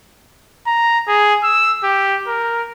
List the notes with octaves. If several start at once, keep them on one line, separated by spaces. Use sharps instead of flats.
A#5
G#4
E6
G4
A#4